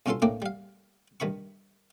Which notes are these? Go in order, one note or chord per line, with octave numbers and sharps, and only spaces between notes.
G2 B2 C#4 F4 A4 C6
A2 A#3 D4 D5 G5 D6
G3 F5
G2 D#3 B5 C#6